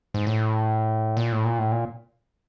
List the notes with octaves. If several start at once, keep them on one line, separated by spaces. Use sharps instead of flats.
G#2
A2
A#2
A2
A#2
A2
A#2